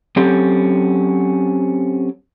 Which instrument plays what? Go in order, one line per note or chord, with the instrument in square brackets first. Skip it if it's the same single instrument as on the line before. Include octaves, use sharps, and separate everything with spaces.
[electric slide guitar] F#3 C4 C#4 G4 A4